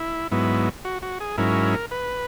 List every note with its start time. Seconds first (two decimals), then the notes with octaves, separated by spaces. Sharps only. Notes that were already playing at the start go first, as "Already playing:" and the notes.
Already playing: E4
0.31 G#2 F#3 B3 E4
0.85 F#4
1.02 F#4
1.20 G#4
1.38 G#2 F#3 C#4 E4 A#4
1.91 B4